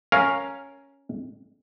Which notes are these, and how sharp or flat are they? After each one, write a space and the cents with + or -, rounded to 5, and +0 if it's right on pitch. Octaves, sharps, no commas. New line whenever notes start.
C#4 +0 A#4 +0 F5 +5